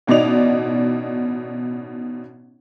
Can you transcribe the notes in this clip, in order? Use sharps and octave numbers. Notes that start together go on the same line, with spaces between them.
A1 B2 D#4 D5 F7